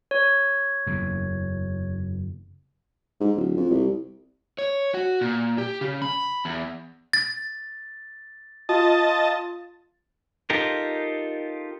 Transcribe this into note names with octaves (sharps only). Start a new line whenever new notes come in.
C#5
F#1 E2
G#2
D1
F2
C2
C#5
F#4
A#2
G4
C#3
B5
E2
A6
F4 D#5 A5
D#4 F4 G4 A4 A#4